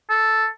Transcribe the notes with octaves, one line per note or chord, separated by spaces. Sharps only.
A4